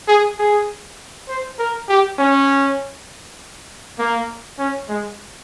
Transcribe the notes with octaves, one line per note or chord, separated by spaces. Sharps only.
G#4
G#4
C5
A#4
G4
C#4
A#3
C#4
G#3